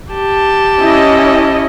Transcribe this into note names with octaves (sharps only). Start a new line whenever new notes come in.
G4 A5
C#4 E4 D#5